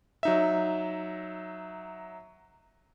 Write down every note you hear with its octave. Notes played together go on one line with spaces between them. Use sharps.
F#3 D#4 E5